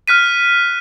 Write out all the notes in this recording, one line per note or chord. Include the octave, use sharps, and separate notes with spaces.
F6 F#6 B6 D#7